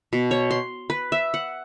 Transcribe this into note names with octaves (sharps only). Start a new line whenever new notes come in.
B2
C#5
C6
B4
E5
F#5